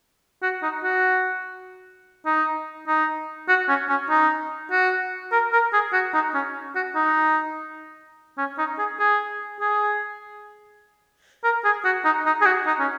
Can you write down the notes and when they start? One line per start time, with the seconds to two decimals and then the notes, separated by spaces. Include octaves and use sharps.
0.42 F#4
0.63 D#4
0.84 F#4
2.26 D#4
2.87 D#4
3.49 F#4
3.69 C#4
3.89 C#4
4.10 D#4
4.71 F#4
5.32 A#4
5.53 A#4
5.73 G#4
5.93 F#4
6.14 D#4
6.34 C#4
6.75 F#4
6.95 D#4
8.38 C#4
8.58 D#4
8.79 G#4
8.99 G#4
9.61 G#4
11.44 A#4
11.65 G#4
11.85 F#4
12.05 D#4
12.26 D#4
12.42 G#4
12.46 F#4
12.66 D#4
12.79 C#4